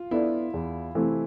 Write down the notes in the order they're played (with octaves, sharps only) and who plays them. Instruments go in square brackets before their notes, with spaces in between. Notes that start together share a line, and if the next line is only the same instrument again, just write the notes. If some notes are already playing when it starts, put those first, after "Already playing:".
Already playing: [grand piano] F4
[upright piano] B3 D4 A4 D5 [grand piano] E4
[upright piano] E2
C3 E3 A3 C4